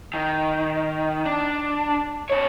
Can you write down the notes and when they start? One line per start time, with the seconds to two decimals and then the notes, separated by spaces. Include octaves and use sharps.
0.14 D#3
1.25 D4
2.30 D3 C#5